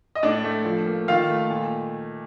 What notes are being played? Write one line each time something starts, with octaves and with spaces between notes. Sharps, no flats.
D#5
A2 D4 D5
A3
F3
A#3
D#3 F4 F5
A3
A#2